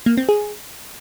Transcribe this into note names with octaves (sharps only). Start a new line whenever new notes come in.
A#3
C4
G#4